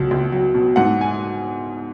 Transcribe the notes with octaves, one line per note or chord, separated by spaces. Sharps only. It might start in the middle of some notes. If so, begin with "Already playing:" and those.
Already playing: C#2 B2 F#3
C#2
F#3
B2
G#2 F#5
G#5